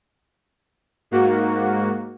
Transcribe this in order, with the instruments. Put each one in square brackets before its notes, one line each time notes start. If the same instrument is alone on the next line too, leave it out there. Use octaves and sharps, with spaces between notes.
[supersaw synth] G#2 A#3 F#4